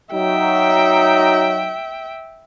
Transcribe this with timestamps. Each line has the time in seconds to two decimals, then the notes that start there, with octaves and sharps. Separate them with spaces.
0.14 F#3 D#4 E5 G5